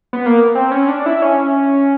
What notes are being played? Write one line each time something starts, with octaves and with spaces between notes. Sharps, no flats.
B3
A#3
C4
C#4
D4
E4
C#4